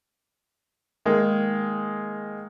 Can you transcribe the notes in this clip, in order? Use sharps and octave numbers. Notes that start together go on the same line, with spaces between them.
D#3 G#3 A#3